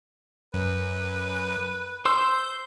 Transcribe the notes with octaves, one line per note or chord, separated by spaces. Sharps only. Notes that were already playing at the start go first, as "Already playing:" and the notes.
F#2 B4
C5 C6 E6 G6